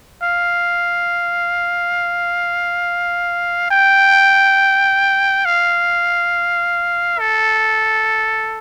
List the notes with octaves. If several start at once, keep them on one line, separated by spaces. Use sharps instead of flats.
F5
G5
F5
A4